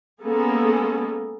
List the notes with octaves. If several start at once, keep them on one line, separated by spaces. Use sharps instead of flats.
G#3 A#3 B3 C#4 G#4 A4